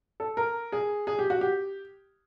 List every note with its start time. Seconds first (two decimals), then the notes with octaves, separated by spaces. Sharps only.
0.20 A4
0.37 A#4
0.72 G#4
1.07 G#4
1.19 G4
1.30 F#4
1.41 G4